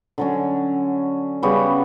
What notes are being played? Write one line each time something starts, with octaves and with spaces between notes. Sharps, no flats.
D3 F#3 C#4
C#3 G3 B3 F#4